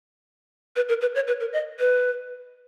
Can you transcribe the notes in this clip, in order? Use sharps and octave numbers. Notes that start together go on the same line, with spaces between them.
B4
A#4
B4
C#5
B4
A#4
D#5
B4